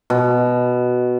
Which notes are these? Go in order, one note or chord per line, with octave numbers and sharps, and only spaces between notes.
B2